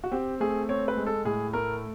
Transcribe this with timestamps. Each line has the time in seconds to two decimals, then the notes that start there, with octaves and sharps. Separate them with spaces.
0.04 F#4
0.11 C4 G4
0.40 A3 G#4
0.69 C4 C#5
0.88 B4
0.97 G#3
1.06 A4
1.25 A2 G#4
1.53 A3 A#4